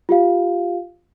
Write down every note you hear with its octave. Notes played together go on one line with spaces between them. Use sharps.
F4 G4 F5